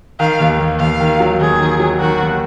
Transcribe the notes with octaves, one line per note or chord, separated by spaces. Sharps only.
D#3 F5
D#2
D#2
D#2 F5
D#3
F#3
D#2 G#4
D#3
F#3
D#3 F#4
D#2